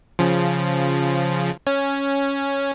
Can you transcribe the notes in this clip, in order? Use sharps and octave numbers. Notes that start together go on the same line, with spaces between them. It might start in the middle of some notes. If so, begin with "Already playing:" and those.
C#3 F3
C#4